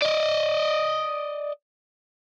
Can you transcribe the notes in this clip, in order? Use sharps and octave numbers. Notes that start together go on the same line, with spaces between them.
D5 D#5